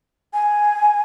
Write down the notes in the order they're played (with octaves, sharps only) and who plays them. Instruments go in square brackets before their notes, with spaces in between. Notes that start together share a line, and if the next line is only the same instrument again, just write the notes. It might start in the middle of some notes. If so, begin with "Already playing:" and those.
[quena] G#5